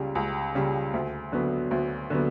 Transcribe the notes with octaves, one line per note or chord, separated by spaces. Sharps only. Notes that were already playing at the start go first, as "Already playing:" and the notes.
Already playing: C#2 C#3 G3
C#2
C#3 G3
D2
D3 F#3 B3
D2
D3 F#3 B3